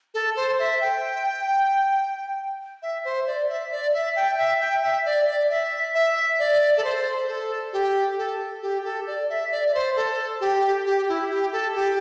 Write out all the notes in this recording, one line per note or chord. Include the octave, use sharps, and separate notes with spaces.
A4
C5
E5
G5
E5
C5
D5
E5
D5
E5
G5
E5
G5
E5
D5
D5
E5
E5
D5
A4
C5
A4
G4
A4
G4
A4
D5
E5
D5
D5
C5
A4
G4
G4
E4
G4
A4
G4